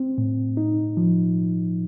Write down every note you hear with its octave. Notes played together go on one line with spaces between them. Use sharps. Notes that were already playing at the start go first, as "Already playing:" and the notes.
Already playing: C4
A2
D#4
F3